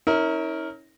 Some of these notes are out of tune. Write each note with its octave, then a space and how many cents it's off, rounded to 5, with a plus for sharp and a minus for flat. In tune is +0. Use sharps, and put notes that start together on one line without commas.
C#4 +0 E4 -45 A#4 +0